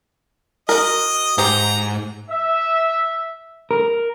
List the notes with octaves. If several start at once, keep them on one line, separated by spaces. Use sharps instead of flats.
F#4 A#4 D#5
G#2 G4 C5 A#5
E5
A#4